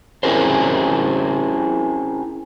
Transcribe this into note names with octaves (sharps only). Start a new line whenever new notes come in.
C4 C#4 E4 G#4 A#4 C5